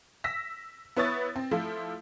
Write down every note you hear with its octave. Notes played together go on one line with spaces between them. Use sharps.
E6 A#6 B6
B3 E4 B4 C#5 D#6 A6
C4
F3 A3 E4 F4